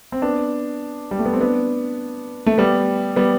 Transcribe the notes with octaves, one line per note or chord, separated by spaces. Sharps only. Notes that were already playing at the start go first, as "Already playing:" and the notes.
C4
B3 D4
G3
A3
B3
C4
B3 D4
A3
G3 B3
G3 B3